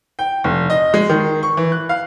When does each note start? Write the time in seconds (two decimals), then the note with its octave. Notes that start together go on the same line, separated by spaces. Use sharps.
0.19 G5
0.44 F1
0.70 D#5
0.94 G#3
1.09 D#3
1.43 C#6
1.57 E3
1.72 F#6
1.89 F5